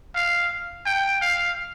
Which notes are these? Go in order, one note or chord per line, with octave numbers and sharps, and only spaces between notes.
F5
G5
F5